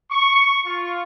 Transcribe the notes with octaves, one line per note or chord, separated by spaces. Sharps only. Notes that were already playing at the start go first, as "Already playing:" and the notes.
C#6
F4